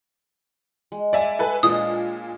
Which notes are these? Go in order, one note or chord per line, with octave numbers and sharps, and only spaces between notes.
G#3
D5 E5 F#5 G#5 A#5
A4 B4 G#5
A#2 G#3 D4 C#5 D#5 D#6